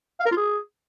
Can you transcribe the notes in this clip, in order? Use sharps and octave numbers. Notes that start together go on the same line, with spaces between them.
F5
A#4
F4
G#4